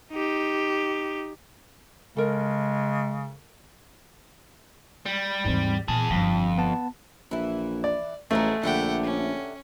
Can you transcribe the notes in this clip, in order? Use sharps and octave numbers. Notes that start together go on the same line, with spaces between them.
D#4 G4
C#3 G#3 A4 A#4
G3
D#2 G#2 E3 C4
E2 A#2 G#4 A5
G1 F2 F3
B3 A5
A#1 E3 E4
D5
A1 F3 F#3 G#3 A3 D#4
A#1 D3 E4 G4 F#5 G5
C#4